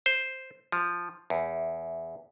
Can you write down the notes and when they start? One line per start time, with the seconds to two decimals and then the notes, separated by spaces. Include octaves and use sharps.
0.06 C5
0.72 F3
1.30 E2